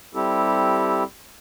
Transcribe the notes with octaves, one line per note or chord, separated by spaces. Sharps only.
G3 C4 E4 G4 A4